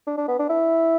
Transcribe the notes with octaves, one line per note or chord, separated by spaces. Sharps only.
D4
D4
B3
D4
E4